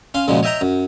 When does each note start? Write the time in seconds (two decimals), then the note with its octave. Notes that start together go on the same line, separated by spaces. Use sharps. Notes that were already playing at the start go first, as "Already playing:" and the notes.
0.14 C#4 F5 C6
0.28 A#2 C#3 F3 F#3 G#3
0.43 C#5 D#5 E5 G5 A#5
0.61 F#2